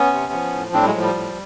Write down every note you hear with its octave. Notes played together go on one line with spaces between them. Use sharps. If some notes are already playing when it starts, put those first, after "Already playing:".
Already playing: B3 C#4
C3
F3
A2
A2 C4 D4
G3
F#3 G#3
F3
G3
A2